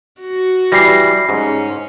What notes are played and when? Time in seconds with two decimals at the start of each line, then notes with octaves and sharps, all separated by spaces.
0.21 F#4
0.72 E3 G3 A#6 C7
1.29 G#2 C#4